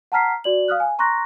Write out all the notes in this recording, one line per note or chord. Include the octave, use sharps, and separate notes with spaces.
F#5 A5 A#5 F6 B6 C7
F#4 D5 F#7
F5 D#6 F6 F#6
G#5
A#5 C6 C#6 F#6 A#6